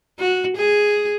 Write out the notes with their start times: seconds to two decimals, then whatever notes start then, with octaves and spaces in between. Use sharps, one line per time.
0.19 F#4
0.57 G#4